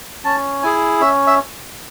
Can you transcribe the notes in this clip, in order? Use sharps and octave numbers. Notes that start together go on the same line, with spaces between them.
C#4 A5
E4 G#4 G#5
C#4 E5
E5